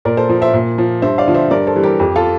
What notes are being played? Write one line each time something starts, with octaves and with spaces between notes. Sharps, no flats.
A#2 A#4 D5
A4 C5
F3
C5 E5
A#2
F3
G2 C5 E5
D5 F5
D3 F3
C5 E5
G2 A#4 D5
A4 C5
E3 G3
G4 A#4
F2 G4
F4 A4